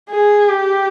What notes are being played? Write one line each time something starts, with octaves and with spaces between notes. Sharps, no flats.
G#4
G4